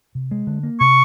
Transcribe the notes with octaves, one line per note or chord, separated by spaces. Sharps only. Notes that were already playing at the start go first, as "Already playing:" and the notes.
C3
G#3
D3
A#3
C3 C#6